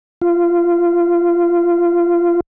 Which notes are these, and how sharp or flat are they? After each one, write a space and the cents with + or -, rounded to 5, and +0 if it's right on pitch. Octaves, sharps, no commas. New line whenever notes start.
F4 -20